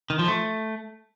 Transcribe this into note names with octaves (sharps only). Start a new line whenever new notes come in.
D#3
F3
A3